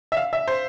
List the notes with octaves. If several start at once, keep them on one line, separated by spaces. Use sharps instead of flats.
E5
F5
E5
C5